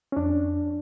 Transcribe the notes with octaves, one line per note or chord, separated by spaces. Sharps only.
C#4
F2 D4